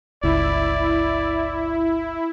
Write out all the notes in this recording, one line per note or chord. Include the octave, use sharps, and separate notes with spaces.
G1 C#2 E4 D5